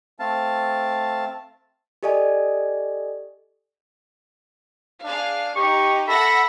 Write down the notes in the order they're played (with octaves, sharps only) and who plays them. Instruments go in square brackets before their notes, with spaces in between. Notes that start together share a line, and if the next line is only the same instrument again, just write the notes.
[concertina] A3 C4 F5 A5
[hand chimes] G4 A4 D5 D#5 G#5
[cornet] D4 [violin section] G#4 F5
[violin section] D#4 [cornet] G4 [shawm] C#6
[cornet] A4 [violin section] E5 F#5 A#6 [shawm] B5